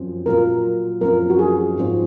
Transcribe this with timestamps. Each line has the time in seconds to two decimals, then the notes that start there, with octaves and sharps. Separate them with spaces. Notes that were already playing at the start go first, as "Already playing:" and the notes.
Already playing: F#2 F3 C4
0.26 A#2 F#3 A#3 F4 A#4
1.01 F#2 F3 C4 F4 A#4
1.30 F#4
1.39 G#4
1.77 G#2 F3 C4 F4 C5